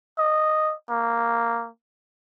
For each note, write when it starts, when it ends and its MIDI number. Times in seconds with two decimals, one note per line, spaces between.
0.18 0.74 75
0.90 1.69 58